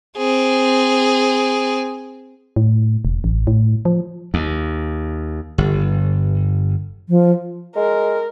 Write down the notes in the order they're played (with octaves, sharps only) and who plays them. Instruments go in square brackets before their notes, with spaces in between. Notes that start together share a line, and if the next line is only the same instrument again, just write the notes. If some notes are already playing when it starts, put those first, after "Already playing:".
[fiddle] C4 G#4
[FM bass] A2
E1
A1
A2
F3
[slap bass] D#2
G1
[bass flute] F3
[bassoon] G#3 [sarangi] A#4